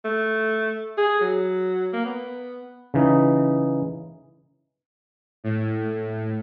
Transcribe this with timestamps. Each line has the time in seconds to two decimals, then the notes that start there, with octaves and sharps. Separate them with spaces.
0.05 A3
0.98 G#4
1.21 F#3
1.93 A#3
2.05 B3
2.94 C#3 E3 D#4
5.44 A2